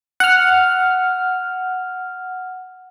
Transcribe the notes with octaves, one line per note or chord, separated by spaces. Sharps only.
F#5 F6